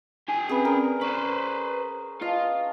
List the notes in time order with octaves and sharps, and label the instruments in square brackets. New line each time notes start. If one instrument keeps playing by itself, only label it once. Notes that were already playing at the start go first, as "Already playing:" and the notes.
[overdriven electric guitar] G4 G#5
[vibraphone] C4 C#4 E5 [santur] G#4 B4
[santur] A#4 [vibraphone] D5 B5
[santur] C#4 [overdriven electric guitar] B4 C5
[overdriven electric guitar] F4 [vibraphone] B4 F5 A5 [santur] D#5